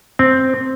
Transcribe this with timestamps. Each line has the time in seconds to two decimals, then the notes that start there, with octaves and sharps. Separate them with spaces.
0.19 C4